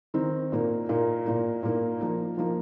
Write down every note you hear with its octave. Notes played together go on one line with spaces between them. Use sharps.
D#3 C4 D#4
A#2 A#3 D#4
A#2 A#3 D#4
A#2 A#3 D#4
A#2 A#3 D#4
F3 A#3 D#4
F3 A#3 D#4